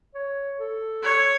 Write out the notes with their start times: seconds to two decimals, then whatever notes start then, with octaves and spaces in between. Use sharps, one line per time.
0.15 C#5
0.60 A4
1.03 C#5